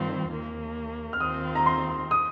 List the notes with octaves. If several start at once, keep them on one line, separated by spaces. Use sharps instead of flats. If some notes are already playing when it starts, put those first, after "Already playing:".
Already playing: G2 D#3 C4 F4
D#2 D#3 A#3
F6
D#2 D#3 C4 F4 D#6
A#5
C6
D#6